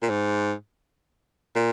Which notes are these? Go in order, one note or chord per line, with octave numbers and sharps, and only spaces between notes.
A#2
G#2
A#2